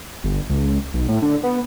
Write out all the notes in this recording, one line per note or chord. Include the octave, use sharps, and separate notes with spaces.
G1
C#2
B1
A2
D3
B3